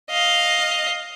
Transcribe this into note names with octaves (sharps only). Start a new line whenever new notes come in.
D#5 F5